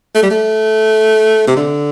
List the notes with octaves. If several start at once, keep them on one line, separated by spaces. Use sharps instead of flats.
A3
G3
A3
C3
D3